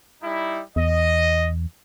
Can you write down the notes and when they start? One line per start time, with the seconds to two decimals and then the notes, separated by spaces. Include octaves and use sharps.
0.22 G3 D#4 E4
0.76 E2 D#5